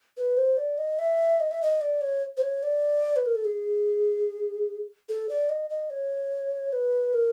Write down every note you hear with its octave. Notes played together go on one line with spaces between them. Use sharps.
B4
C5
D5
D#5
E5
D#5
E5
D#5
D5
C#5
C5
C#5
D5
B4
A#4
A4
G#4
A4
D5
D#5
D#5
C#5
B4
A#4